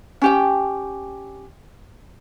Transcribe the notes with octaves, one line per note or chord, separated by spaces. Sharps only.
C#4 G4 G5